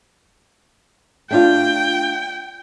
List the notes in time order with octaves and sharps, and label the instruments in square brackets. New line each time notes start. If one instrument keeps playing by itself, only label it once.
[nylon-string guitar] A3 D4 F4 [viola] G5